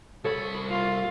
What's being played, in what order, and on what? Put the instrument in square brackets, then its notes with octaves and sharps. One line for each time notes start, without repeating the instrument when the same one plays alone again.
[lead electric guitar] C2 B5 [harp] A4 C#5
[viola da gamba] F4